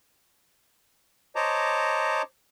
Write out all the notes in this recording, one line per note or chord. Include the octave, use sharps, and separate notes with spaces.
C5 C#5 D#5 A5 A#5 D6